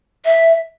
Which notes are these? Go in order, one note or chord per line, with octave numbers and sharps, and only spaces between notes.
E5